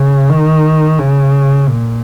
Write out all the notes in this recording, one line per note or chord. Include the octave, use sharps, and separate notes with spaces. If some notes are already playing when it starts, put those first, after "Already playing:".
Already playing: C#3
D#3
C#3
A#2